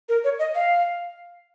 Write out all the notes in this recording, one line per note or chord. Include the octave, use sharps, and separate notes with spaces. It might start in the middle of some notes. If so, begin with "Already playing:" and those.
A#4
C#5
D#5
F5